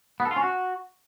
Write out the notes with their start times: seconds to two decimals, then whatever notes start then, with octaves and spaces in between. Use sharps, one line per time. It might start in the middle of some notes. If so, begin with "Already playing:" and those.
0.20 B3
0.25 A4
0.31 F4
0.36 C#4
0.42 F#4